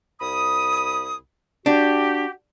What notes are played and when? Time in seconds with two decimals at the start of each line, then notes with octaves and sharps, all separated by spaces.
0.20 C2 B5 D#6
1.66 D4 F#4 G4